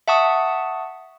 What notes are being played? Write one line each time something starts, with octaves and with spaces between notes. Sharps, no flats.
E5 F#5 A5 C#6 D#6